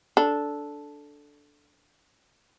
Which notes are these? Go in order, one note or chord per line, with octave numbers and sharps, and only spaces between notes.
D4 A4